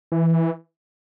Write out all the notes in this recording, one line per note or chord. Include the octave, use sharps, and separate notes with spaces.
E3